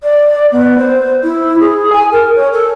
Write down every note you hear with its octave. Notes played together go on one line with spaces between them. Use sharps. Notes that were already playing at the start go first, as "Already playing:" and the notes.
D5
B3
C5
E4
G#4
G#5
A#4
C#5
A4